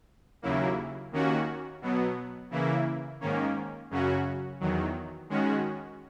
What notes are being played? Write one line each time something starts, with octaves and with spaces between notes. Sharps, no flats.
D#2 C#3 F#3 A#3 E4
D#2 D#3 A#3 C#4 F#4
B2 F#3 B3
C#3 E3 A#3 E4
G#2 D#3 A#3 C#4
F#2 C#3 F#3 C#4 F#4
E2 D#3 F#3
D#3 G#3 C#4 F#4